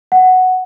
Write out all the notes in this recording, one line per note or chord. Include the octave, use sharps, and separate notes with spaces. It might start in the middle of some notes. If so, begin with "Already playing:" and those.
F#5